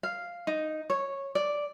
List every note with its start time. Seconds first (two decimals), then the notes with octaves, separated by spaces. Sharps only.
0.03 F5
0.47 D#4
0.90 C#5
1.35 D5